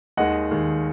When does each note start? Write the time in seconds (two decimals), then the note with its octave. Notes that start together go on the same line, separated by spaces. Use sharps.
0.17 D#2 D#3 G#3 D#5 F#5
0.51 D#2 D#3 G#3